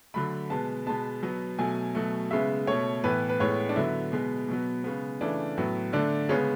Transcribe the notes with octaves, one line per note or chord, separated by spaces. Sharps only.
D3 F#3 A3 B5
B2 G#3 B3 A5
B2 G#3 B3 A5
B2 F#3 B3
B2 F#3 A3 G#5
B2 F#3 A3
C#3 G#3 B3 E5
B2 A3 C#5
A2 E3 B3 B4
B4
A2 G#3 B3 C#5
D4
D3 F#3 B3 E4
B2 G#3 B3
B2 F#3 B3
C#3 G#3 B3
C#3 E3 A3 D4
A2 F#3 B3
D3 A3 D4
C#3 G#3 B3 C#4